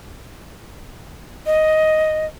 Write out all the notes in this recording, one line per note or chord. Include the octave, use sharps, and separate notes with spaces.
D#5